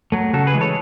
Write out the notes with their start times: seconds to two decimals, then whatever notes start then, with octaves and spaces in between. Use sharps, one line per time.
0.12 F#3 A3
0.33 C#3 F#4 A4
0.47 G#4 B4
0.54 E3 G#3
0.61 A4 C#5